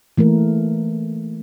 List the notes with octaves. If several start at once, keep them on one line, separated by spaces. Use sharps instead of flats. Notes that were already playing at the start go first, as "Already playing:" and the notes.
E3 A3 A#3 A#4